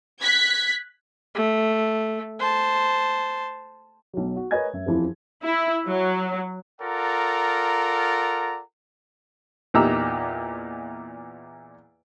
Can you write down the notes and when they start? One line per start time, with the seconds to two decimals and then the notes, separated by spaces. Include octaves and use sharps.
0.22 F#6 G#6 B6
1.35 A3
2.40 C5 A5
4.13 B1 F#3
4.36 F#4
4.51 A#4 B4 C#5 D#5 G#5 G#6
4.73 F#2 E5
4.86 D#1 F2 E3 F3 E4
5.43 E4
5.88 F#3
6.81 F4 A4 A#4 D5 F#5 A#5
9.74 E2 A#2 D#4 G4 A#5 E6